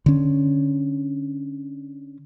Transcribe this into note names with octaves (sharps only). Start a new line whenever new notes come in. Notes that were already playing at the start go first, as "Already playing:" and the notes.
D3 C#4